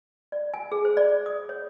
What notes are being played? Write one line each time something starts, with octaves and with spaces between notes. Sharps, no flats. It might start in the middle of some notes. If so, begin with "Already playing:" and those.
D5
G#5
G#4
C5
D5
D#6
C#5